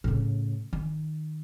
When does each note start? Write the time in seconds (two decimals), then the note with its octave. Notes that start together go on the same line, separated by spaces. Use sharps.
0.04 A2 C#3
0.73 D#3